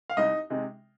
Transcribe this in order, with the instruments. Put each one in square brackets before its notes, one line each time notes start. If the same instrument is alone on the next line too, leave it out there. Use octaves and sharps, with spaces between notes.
[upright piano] F5
C2 D#4 D#5
C3 G#3 D#4